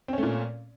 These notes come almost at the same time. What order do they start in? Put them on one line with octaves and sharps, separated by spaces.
C4 C#4 A3 A#2